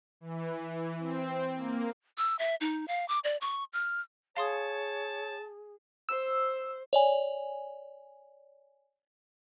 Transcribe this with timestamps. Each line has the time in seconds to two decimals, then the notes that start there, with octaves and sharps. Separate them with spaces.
0.21 E3
0.99 C4
1.55 A#3
2.18 E6
2.39 E5
2.61 D#4
2.88 F5
3.08 D6
3.24 D5
3.41 C#6
3.73 F6
4.37 G#4 C#5 F5 A5 C6 D#6
6.09 C5 E6
6.93 C#5 D5 G#5